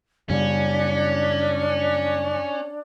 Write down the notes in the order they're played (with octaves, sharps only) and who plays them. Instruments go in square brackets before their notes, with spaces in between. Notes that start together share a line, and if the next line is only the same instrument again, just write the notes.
[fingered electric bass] F#2 C#3 G3 [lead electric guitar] C#4 [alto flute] D4